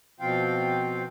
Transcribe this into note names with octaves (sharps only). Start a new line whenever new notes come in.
B2 F3 C4 F4 F5 G5